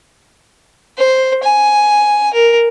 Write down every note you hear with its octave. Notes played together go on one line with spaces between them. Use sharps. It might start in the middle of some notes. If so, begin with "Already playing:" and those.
C5
G#5
A#4